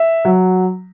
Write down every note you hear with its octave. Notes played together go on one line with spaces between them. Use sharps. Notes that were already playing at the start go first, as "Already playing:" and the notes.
Already playing: E5
F#3